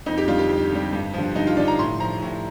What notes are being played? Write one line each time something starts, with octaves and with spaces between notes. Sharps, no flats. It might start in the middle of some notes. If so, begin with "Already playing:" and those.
F2 D#4
G4
D3 G3 F4
G4
F2
D3 G3
G2
D3 F3
G2 D#4
F4
D3 F3 D5
A#5
A2 C6
F3 A#5
A2